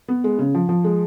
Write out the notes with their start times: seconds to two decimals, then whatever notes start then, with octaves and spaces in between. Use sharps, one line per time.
0.08 B3
0.24 G#3
0.39 C#3
0.55 F3
0.69 F3
0.84 G#3